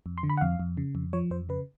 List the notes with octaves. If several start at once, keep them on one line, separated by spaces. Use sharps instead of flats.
F2
C6
D3
B5
F#5
F2 F5
F2
C#3
F2
F3 C#5
F2 C5
C#3 B4